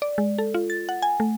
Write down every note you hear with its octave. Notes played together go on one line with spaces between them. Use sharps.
D5
G#3
A4
F4
A6
F#5
G#5
A3